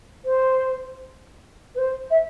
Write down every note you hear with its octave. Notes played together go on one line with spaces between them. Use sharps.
C5
B4
C5
E5